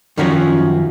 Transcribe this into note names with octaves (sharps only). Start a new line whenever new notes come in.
F#2 D#3 F3 C#4 F#4 C#5